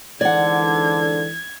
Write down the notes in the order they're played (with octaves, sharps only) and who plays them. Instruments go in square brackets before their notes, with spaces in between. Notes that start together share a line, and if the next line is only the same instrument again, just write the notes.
[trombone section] G#2 D3 [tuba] E3 [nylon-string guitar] D5 F#5 [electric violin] G#6